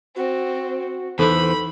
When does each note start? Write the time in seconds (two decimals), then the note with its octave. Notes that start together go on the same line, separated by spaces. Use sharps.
0.16 C4 F#4
1.19 E2 E3 D#4 A4 C5 B5 C#6